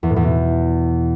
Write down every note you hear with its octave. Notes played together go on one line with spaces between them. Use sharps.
E2
A2
E2
B2